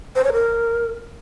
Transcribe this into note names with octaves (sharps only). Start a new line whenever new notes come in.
C5
C#5
A#4